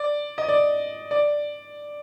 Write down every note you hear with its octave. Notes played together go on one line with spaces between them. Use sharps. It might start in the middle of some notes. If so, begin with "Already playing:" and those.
Already playing: D5
D#5
D5
D5